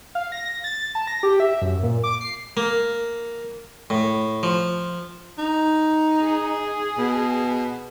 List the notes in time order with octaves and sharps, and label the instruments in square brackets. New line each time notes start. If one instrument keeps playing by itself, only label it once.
[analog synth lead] F5
A#6
A6
A5
A#6
G4
E5
F#2
A#2
D6
C7
[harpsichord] A#3
A2
F3
[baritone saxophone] D#4
[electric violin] G#4
[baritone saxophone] B2